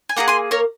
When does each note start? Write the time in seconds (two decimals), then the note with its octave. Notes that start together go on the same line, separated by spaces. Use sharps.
0.09 G#5
0.16 A#3 F4 G#4 F#5 A#5
0.28 G#5 C6
0.51 A#4 C#5